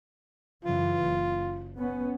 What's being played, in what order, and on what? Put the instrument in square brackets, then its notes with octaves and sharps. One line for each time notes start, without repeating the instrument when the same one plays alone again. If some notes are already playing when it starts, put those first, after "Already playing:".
[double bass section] F#2 C#3 E3 [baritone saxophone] F4
[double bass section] F#1
B3 C#4